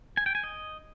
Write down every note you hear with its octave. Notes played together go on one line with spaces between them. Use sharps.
G#5
G5
G#5
D#5